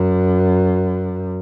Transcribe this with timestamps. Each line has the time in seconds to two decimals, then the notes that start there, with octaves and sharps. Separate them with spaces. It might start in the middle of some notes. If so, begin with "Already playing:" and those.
Already playing: F#2